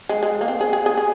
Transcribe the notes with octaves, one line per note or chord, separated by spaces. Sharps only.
G#3
G#3
A#3
C4
G#4
G#4
G#4
G#4